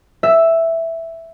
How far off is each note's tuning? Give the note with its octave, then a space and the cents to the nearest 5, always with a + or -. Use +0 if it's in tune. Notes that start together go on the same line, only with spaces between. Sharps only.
E5 +0